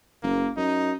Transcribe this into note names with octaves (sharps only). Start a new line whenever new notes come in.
F#1 A#3
F#2 D#4